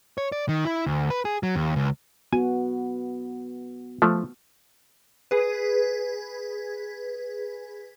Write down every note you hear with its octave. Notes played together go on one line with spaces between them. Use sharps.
C#5
D5
D#3
E4
D2
B4
G#4
F#3
D#2
C#2
B3 F#4 G#5
F3 A3
G#4 B4